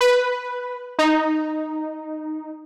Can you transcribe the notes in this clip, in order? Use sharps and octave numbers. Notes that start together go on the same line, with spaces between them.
B4
D#4